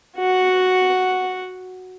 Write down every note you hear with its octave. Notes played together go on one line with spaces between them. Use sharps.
F#4 F#5